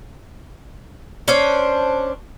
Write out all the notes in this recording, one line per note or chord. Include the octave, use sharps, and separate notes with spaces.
C#4 D4 C5